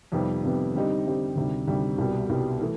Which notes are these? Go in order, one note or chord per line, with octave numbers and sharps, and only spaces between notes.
F2 C3 D#3 G3 B3
F2 C3 D#3 G3 B3
D3 G3 C4 D#4 G4
D3 G3 C4 D#4 G4
D2 C3 D#3 G3
D2 C3 D#3 G3
C2 B2 G3
C2 B2 G3
E3 A3